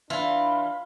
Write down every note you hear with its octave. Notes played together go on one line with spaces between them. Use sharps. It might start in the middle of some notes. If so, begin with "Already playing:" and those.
E3 D4 F4 B5